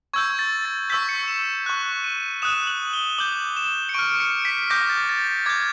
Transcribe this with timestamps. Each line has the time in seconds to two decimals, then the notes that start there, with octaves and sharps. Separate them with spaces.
0.14 C#6 E6 G6 G#6
0.39 A6
0.65 A6
0.90 C#6 E6 G6 B6
1.09 C#7
1.28 E7
1.66 C#6 F#6
2.04 D#7
2.42 D#6 F#6 E7
2.67 F#7
2.93 G7
3.18 D6 G6 F#7
3.57 E7
3.89 C#7
3.94 C#6 F6 D7
4.20 C#7
4.45 B6
4.70 D6 G6 A#6
4.90 A6
5.09 A6
5.28 A6
5.46 D6 G6 G#6